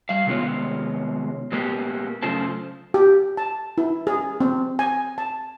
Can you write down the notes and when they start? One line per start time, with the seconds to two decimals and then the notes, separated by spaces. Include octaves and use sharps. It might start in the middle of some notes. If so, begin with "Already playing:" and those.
0.09 G3 F5
0.26 C3 D#3 G#3 B3 F4 C#5
1.52 A#2 G#3 A#3 B3 E4 G4
2.23 F#2 C#3 A3 F4 C5 A5
2.94 G4
3.37 A5
3.78 E4
4.07 G#4
4.40 C4
4.79 G#5
5.18 A5